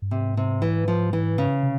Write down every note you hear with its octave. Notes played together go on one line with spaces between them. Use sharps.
G2
G#2 C3
C3
E3
F3
E3
C#3
C3